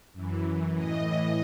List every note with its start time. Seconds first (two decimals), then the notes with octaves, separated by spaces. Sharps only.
0.13 F#2 E3
0.75 A2 E3 D#5
1.06 D#5